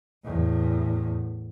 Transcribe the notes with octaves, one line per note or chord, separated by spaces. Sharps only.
E2 A2